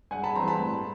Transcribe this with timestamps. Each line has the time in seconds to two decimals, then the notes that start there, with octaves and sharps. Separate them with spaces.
0.11 G2 F#5 G#5
0.24 A5 B5
0.35 E3 G3 C4 A#5 C6
0.47 A5 B5
0.60 A2